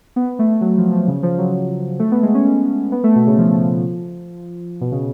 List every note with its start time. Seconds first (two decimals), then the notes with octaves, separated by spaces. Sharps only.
0.16 B3
0.39 A3
0.61 F#3
0.78 F3
0.92 F3
1.08 C#3
1.23 F3
1.38 F#3
1.99 A3
2.12 B3
2.23 G#3
2.34 C#4
2.92 B3
3.04 A3
3.16 B2
3.27 C#3
3.38 F3
4.81 B2
4.92 C#3